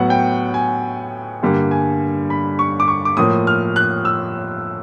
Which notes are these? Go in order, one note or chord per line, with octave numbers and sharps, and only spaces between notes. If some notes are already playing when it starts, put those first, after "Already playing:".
Already playing: A2 F#3 B3 F#5
G5
G#5
G2 D3 G3 A#3
G#5
B5
C#6
D6
C#6
D6
A2 F3 A#3 D#6
F6
F#6
E6